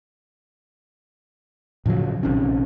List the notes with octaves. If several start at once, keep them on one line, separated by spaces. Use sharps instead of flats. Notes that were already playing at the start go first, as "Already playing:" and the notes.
A2 C#3 F3 F#3
A#1 C3 D#3 C#4